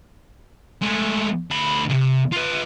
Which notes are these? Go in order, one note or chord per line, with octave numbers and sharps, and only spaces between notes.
G#3 A3
D2 B5
B1 C3
F4 B4